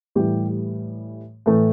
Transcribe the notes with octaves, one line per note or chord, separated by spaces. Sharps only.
A2 E3 G3 G4
A2 E3 A3